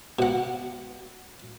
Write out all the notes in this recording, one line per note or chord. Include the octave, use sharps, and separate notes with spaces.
B2 F#5